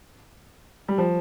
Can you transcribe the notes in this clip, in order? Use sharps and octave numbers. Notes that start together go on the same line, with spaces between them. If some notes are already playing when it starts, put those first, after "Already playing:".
G3
F3